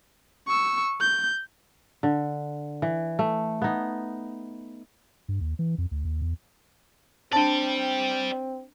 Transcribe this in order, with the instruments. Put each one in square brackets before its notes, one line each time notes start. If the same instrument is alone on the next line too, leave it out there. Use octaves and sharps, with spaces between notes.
[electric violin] C#6 E6
G6
[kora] D3
E3
A3
B3 D#4
[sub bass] G2
D#2
E3
F2
D2
D#2
E2
[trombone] C4 [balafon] D4 A5 [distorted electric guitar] D5 G5